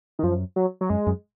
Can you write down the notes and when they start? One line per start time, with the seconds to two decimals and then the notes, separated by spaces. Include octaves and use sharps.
0.19 D#3
0.23 F#2 F3
0.56 F#3
0.81 F#3
0.89 F#2 G#3
1.07 F#2